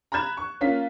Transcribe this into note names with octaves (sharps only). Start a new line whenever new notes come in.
A#5 B5 F#6 G#6 E7
C#6
A#3 C#4 F4 B6